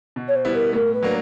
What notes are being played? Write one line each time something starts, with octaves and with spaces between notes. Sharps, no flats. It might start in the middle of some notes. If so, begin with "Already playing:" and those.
B2
C#5
C5
G3 B3 E4
A#4
A2 A#4
B4
F#3 A#3 D4